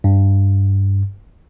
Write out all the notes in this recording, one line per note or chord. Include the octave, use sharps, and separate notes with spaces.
G2